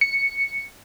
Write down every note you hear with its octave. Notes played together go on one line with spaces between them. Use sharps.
C#7